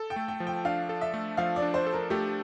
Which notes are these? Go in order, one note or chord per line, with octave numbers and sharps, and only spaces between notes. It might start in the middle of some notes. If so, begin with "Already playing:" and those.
Already playing: A4
G5
A3
G5
F3
G5
D4 F5
A4
E5
A3
F3 F5
D5
D4
C5
A4
A#4
A3 G4